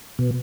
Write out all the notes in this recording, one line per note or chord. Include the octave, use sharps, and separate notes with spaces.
B2